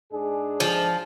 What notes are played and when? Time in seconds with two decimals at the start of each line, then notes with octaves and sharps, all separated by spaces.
0.12 G#2 D4 G#4
0.60 F3